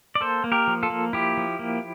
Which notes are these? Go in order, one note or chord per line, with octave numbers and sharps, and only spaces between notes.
D5
A#3 A4 C5
A#3
G4 A#4
F3
F4 A4
A#3
F3 E4 G4
F3
A#3